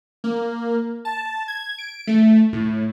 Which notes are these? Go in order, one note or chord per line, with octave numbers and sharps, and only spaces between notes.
A#3
A5
G#6
D7
A3
A2